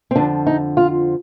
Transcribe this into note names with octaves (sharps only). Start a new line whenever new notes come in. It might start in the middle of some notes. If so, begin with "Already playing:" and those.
C4
F2 D3 F3 D4
D#4
F4